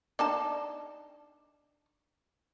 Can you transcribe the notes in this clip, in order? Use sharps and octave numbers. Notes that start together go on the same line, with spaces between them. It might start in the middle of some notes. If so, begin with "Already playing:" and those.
D4 D#4 A5